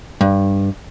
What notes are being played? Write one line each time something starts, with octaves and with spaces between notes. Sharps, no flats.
G2